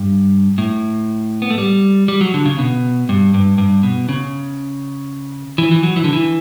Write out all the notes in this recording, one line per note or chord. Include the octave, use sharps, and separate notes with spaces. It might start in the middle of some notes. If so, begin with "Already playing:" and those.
Already playing: G2
A2
B3
A3
G3
G3
F#3
D3
C#3
B2
G2
G2
G2
B2
C#3
E3
E3
F#3
E3
D3
E3